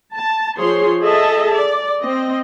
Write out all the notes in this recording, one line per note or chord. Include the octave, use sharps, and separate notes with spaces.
A5
F3 G#4 C5 C#5 C6
G#4 A4 D#5 E5 A5
D5
C4 D#5